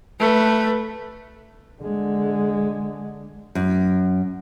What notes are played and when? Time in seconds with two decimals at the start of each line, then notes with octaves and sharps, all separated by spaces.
0.20 A3 B4
1.82 D3 G#3
3.55 F#2